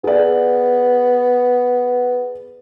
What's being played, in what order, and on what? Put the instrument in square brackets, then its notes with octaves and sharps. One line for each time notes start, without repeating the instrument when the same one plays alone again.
[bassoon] B3 [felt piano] G#4 D5